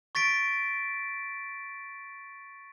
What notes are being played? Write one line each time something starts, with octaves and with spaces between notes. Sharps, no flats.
C#6 A6 B6 D7